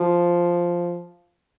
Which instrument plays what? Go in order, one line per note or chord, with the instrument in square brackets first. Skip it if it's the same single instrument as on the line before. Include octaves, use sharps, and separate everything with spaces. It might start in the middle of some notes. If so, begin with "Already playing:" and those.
Already playing: [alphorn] F3